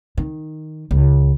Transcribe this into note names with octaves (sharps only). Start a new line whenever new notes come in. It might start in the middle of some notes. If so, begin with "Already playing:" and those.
D#3
C#2